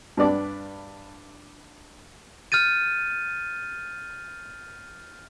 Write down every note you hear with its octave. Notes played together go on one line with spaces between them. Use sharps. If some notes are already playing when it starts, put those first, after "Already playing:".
G2 D4 B4 D5 D6
F6 G6 A6 D#7